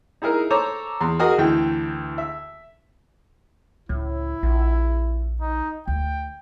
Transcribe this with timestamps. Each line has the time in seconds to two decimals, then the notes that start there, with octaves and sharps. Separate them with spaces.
0.22 D#4 E4 G#4 A#4
0.50 A4 C5 C#5 A#5 D6
1.01 E2 C6
1.19 F#4 G#4 A#4 D#5
1.38 D2 E3 G5
2.18 E5
3.89 C#2 A2 E4
4.43 A#1 F4
5.41 D#4
5.88 D2 G5